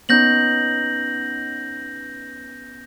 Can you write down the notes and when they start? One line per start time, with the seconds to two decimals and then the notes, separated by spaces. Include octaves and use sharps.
0.09 B3 C#4 D#4 G6 A#6 F#7